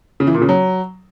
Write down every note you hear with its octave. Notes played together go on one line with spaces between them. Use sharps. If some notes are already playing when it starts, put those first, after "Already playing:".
C#3
E3
A#2
C#3
F#3